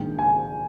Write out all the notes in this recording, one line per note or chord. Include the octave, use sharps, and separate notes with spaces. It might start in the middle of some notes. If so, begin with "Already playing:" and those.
Already playing: A#1 G#2 D#3 G5
G#5